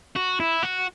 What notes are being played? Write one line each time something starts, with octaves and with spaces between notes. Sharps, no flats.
F#4
E4
F#4